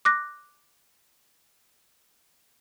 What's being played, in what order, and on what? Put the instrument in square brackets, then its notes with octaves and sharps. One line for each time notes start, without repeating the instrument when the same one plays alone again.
[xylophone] D6 F#6 A#6